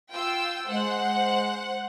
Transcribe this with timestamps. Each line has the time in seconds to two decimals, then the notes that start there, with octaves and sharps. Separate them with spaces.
0.12 F4 G5 E6
0.67 G#3 C5 F#5